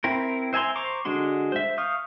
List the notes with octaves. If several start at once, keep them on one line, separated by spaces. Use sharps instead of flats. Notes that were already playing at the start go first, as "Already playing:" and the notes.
C4 E4 A#4
C5 E5 G#5 A#5 C6
C5 A#5 C#6 D6
D3 G#3 D4 F#4 C6
C5 E5
F5 C#6 D#6 F6 G6